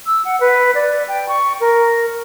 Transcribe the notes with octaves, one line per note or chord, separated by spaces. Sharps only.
E6
F#5
B4
D5
G5
C#6
A#4